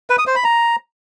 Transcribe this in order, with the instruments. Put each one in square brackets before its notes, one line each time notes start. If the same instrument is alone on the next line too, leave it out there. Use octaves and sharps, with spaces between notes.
[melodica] B4
D#6
C5
B5
A#5